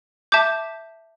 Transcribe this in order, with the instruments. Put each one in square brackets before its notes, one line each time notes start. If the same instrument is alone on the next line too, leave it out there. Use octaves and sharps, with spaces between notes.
[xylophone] E5 A5 D6 G6